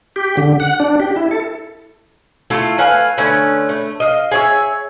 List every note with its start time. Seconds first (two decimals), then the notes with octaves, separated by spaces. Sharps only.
0.16 G4
0.37 D3
0.60 F#5
0.80 D4
1.00 G4
1.16 E4
1.31 A4
2.50 A3 E4 F4 A4
2.78 A3 B4 F5 G#5
3.18 D3 A3 C#4 B4
3.69 A3
4.00 D#5 F5
4.31 G#4 C#5 E5